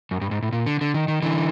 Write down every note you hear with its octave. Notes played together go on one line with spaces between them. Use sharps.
F#2
G2
G#2
A2
A#2
D3
D3
D#3
D#3
D3 E3